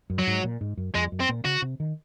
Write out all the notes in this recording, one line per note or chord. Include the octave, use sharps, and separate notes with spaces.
F#2
F#3
G#2
A#2
G#2
F#2
F2 G#3
F#2
C4
A#2
C#3 F#4
C3
D#3